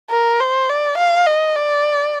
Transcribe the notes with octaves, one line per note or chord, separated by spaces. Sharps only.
A#4
C5
D5
F5
D#5
D5